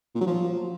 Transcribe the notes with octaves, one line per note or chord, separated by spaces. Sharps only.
A#2
F#3
F3